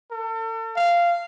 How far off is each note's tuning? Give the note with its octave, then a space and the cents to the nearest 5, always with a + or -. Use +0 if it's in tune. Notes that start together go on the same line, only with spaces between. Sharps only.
A4 +40
F5 -10